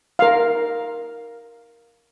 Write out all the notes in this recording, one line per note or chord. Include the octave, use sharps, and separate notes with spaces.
A#4 F5